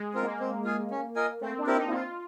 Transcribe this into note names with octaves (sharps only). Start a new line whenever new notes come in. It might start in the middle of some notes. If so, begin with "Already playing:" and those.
Already playing: G#3
C4 F4 A#4
A#3
C4
F4 G#4
C#4
F4 A#4 D#5 G#5
A3 C4
D4
C4 E4 G4 A#4
D#4
E4
C4 F4